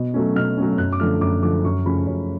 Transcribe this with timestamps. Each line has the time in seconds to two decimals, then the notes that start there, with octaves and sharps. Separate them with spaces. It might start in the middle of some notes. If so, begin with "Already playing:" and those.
Already playing: B2
0.14 F#3 A3 C#4
0.36 B2 F6
0.57 F#3 A3 C#4
0.78 F#2 F#6
0.93 D6
1.00 D3 F3 A3 F6
1.21 F#2 D6
1.43 D3 F3 A3 D6
1.64 F#2 C#6
1.86 C#3 F3 A3 C#4 B5
2.07 F#2 C#5